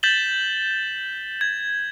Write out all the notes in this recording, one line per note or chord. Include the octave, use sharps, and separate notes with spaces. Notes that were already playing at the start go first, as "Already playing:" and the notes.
G6 A6 B6 E7 F#7 G7
G#6